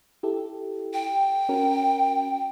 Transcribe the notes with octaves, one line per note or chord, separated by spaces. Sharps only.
E4 G4 A4
G5
C#4 F#4 A#4